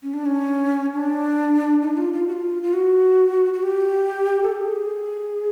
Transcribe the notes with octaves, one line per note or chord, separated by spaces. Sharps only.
C#4
D4
C#4
D4
D#4
F4
F4
F#4
F4
F4
F#4
F#4
G4
A4
G#4